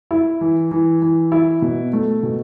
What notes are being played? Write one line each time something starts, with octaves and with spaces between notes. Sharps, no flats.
E4
E3
E3
E3
E4
B2
A3
B2